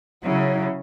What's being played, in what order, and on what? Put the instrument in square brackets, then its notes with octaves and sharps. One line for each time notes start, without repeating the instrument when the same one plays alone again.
[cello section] C#3 [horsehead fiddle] F#3 E4